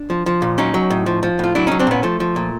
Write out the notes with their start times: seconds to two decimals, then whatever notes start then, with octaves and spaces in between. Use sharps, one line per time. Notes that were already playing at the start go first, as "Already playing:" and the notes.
Already playing: D4
0.10 F3
0.26 F3
0.42 A#2
0.58 F#3 C#4 D#4
0.74 F#3
0.90 A2
1.06 F3
1.23 F3
1.39 A2 F4
1.55 F#3 D4 E4
1.67 F#3 C#4 D#4
1.79 C4 D4
1.87 A#2 B3 C#4
2.03 F3 A3
2.20 F3
2.36 A#2